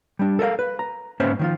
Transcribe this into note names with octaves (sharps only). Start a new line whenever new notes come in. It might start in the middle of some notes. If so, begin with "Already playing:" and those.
G3 D4
A4 A#4 D#5 F5
B4
A#5
G#2 A#3 C#4 B4 C5 E5
D#3 F3 F4